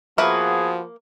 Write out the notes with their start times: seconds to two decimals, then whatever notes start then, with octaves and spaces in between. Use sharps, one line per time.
0.18 F3 A#3 B3 F#4 G#4 A#4 B4 E5